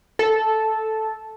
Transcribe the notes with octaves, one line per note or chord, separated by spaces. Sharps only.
A4